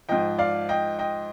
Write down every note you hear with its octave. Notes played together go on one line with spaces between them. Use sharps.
G#2 F3 D#5 G5
D5 F5
D#5 G5
D#5 G5